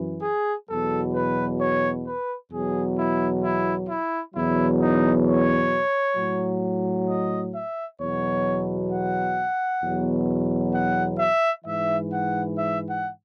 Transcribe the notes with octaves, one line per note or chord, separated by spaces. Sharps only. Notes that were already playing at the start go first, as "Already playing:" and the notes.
Already playing: F#2 E3
G#4
E2 B2 F#3 A4
B4
C#5
B4
E2 B2 F#3 G#4
E4
E4
E4
E2 B2 F#3 E4
D#4
C#5
A2 F#3
D#5
E5
E2 B2 F#3 C#5
F#5
E2 B2 F#3
F#5
E5
G#2 E3 E5
F#5
E5
F#5